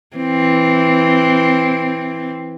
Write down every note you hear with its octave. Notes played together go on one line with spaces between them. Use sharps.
E3 C4